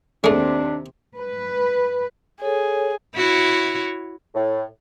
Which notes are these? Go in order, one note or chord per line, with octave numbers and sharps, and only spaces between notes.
D#2 C3 G#3 A3 C4 D4
B4
G#4 A4 C#5
E4 F#4 C#5
A2